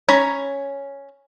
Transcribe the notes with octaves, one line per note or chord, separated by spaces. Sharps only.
C#4 C#5 A#5 B5